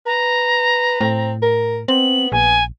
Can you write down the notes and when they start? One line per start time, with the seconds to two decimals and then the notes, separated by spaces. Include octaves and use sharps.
0.06 B4 A#5
1.01 A2 C4
1.42 A#4
1.88 B3 C4 F#7
2.32 A#1 G#5